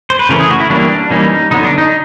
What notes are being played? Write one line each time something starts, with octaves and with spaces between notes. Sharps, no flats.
C5
B4
C#3 E3 A3 C#4 A#4
G#4
F#4
E4
E3 G3 A#3 C#4 D4
E3 G3 A#3 C#4 D#4
D3 F#3 B3 D#4
D4
D#4